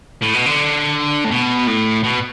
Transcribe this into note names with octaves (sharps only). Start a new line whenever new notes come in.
A2
B2
D3
A2
B2
A2
B2